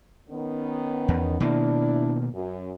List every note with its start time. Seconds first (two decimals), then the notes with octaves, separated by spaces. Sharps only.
0.30 D#3 B3 C#4
1.08 E2
1.40 B2 D#3 A#3 D4 E4
2.33 F#2